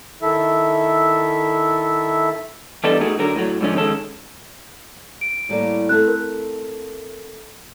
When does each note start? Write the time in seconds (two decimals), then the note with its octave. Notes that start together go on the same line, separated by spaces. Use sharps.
0.22 D#3 E4 A4 E5
2.84 E3 G3 B3 D4 D#4 A4
3.01 A3 D#4 F#4 G#4 A#4
3.18 D3 F#3 A#4
3.36 A2 F#3
3.61 G#2 D3 F3 C#4
3.75 D#3 G#3 C#4 A4
5.21 D7
5.49 A2 G3 A#3
5.89 A3 C4 F#6
6.08 A#4